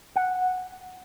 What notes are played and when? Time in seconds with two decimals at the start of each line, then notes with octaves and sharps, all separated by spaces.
0.16 F#5